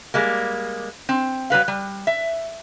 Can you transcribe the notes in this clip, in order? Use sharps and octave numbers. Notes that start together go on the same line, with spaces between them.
G3 G#3 A#3
C4
F#3 G3 B4 F5
G3
E5